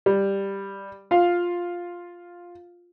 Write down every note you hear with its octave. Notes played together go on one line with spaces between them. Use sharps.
G3
F4 F5